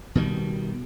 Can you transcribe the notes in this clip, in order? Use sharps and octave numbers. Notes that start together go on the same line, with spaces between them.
B2 D#3 G3